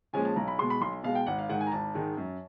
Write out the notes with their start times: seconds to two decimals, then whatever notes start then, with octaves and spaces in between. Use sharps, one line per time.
0.13 A#2 F3 G#3 C#4 G#5
0.25 A5
0.36 B1 A#5
0.48 B5
0.59 B2 G#3 C6
0.70 B5
0.81 B1 C6
1.03 B2 G#3 F5
1.15 G5
1.26 G#1 F#5
1.39 F5
1.49 G#2 D#3 G#3 F#5
1.61 G#5
1.67 A#5
1.72 G#1 A5
1.94 G#2 D#3 G#3
2.17 F#2